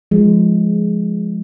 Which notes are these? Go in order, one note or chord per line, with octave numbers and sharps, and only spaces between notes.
F3 G#3